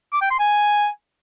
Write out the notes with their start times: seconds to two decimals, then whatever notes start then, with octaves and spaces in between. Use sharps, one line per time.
0.13 D6
0.22 G5
0.31 C6
0.40 G#5